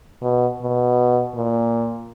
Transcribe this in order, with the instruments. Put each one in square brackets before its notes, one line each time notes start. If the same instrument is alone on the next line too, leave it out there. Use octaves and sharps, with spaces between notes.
[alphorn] B2
B2
A#2